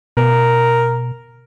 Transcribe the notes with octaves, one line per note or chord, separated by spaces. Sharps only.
B2 A#4